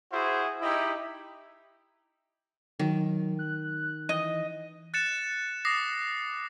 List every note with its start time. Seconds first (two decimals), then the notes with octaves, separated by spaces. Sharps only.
0.12 E4 F#4 G#4 C5
0.62 D#4 E4 G4 D#5
2.79 D#3 F#3
3.39 F#6
4.09 E3 D#5
4.94 F#6 A6 C#7 E7
5.65 D6 D#6 A#6 C7